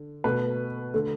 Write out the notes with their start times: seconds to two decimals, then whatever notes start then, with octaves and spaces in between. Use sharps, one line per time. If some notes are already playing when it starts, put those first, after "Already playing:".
Already playing: D3
0.24 B2 A3 B4
0.94 D3 A3